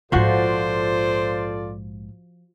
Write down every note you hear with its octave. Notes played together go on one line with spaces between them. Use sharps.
A#1 G#2 F3 F4 F#4 A4 C5 D5